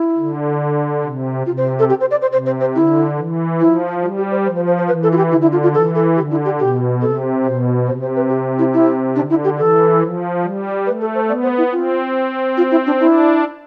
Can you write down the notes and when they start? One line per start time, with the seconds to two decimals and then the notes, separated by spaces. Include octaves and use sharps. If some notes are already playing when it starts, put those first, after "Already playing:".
Already playing: E4
0.18 D3
1.04 C3
1.46 C3 F4
1.57 C5
1.79 A4
1.89 G4
2.00 C5
2.11 D5
2.22 C5
2.32 C3 C5
2.46 C5
2.60 C5
2.75 D3 E4
3.18 E3
3.60 F3 E4
4.02 G3 F4
4.17 G4
4.31 C5
4.45 F3 C5
4.56 C5
4.67 C5
4.78 C5
4.88 E3 B4
5.03 A4
5.12 F4
5.17 G4
5.31 D3 E4
5.42 E4
5.52 F4
5.63 F4
5.74 E3 A4
5.95 A4
6.16 D3 G4
6.31 E4
6.45 G4
6.59 B2 G4
7.02 C3 A4
7.45 B2 C5
7.88 C3 C5
8.01 C5
8.16 B4
8.30 G4
8.58 E4
8.73 E4
9.16 D3 D4
9.30 E4
9.44 G4
9.58 E3 A4
10.01 F3
10.44 G3
10.86 A3 B4
11.01 A4
11.15 C5
11.28 B3 D5
11.43 C5
11.58 E4
11.72 C4 F4
12.57 F4
12.71 E4
12.86 D4
12.99 D4 E4